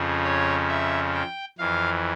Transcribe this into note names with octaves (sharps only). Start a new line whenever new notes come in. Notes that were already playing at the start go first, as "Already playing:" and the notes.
Already playing: F2 C#3 F3
C#5
E5
G5
F2 E3 F5